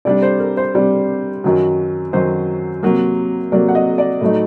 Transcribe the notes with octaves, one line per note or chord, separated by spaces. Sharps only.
C3 G3 D4 D5
C5
A#4
C5
C3 G3 D4
F#2 D#3 F#3
F#2 D#3 F#3 C5
C3 F#3 A#3
C3 F#3 A#3 D5
F#5
D#5
D5
A2 F#3 A3 D#4